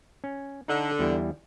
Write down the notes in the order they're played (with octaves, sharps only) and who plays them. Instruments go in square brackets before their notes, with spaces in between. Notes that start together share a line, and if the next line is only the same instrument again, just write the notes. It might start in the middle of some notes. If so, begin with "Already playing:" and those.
[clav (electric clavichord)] C#4
[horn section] D3 [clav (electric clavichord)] D#4 A4
[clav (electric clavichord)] E2 G3 E4